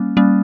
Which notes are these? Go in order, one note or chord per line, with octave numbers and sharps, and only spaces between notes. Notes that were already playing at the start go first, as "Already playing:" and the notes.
Already playing: G3 A#3 C#4
G3 A#3 C#4